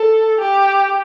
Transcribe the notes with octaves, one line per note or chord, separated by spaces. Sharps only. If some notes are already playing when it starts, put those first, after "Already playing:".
Already playing: A4
G4